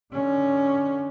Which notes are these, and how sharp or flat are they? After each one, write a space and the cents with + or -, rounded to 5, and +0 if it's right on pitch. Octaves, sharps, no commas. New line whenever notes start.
D3 +25 C#4 +10